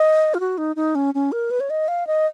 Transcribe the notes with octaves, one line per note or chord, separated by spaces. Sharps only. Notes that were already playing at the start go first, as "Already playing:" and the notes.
Already playing: D#5
F4
F#4
D#4
D#4
C#4
C#4
A#4
B4
C#5
D#5
F5
D#5